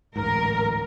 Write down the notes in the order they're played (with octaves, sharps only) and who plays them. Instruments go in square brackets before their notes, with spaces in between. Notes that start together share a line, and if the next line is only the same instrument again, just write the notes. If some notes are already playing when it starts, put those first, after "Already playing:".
[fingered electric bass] D1 A1 G#2 [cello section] A#4